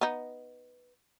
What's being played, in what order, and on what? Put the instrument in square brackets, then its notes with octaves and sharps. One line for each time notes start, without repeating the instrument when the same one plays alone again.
[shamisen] B3 D#4